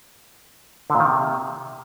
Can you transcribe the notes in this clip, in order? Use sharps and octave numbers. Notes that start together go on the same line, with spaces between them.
D3
A#2
D#3
C3